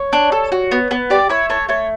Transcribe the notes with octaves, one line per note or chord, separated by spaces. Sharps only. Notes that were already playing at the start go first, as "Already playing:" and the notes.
Already playing: C#5
D4
A4
F#4
B3
B3
G4 D5
E4 C#5
A3 C#5
A3 C#5